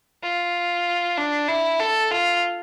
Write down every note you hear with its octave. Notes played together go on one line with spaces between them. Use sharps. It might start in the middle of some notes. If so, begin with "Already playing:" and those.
F4
D4
E4
A4
F4